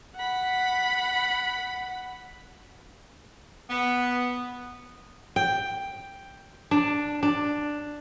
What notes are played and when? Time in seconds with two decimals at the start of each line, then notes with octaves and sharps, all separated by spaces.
0.16 F#5 B5
3.70 B3
5.36 G5
6.71 D4
7.23 D4